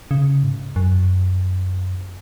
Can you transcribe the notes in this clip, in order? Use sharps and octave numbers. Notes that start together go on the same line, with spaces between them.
C#3
G#2
F#2